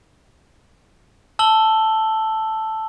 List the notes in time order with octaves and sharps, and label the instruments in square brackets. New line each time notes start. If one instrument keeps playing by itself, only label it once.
[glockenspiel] A5 E6 F#7 G7